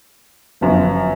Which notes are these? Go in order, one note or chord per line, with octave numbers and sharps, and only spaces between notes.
G1 F#2 D3 F3